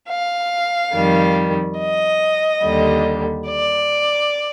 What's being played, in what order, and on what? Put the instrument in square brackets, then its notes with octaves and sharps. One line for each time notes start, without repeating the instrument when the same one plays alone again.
[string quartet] F5
F2 D#3 G3
D#5
D#2 D3 G3
D5